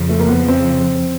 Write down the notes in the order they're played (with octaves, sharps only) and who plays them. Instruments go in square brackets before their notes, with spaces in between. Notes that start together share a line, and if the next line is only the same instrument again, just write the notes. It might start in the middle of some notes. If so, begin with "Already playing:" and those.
Already playing: [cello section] F2 C#3 F3
[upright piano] A3
A#3
B3
C4